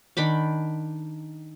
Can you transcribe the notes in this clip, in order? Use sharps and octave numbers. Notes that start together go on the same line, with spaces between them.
D#3 D4 B5 D6